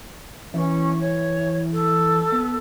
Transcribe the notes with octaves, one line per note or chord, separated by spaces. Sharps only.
E3 C#4
C#5
A4
B3